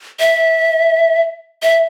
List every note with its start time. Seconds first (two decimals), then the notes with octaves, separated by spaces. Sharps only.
0.20 E5
1.63 E5